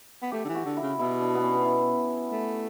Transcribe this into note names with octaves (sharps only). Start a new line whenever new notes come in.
B3
A3 G4
D3
E3
F#4
D3
E4
C#3
B2 E4
D4
B3
C#4
E4
A3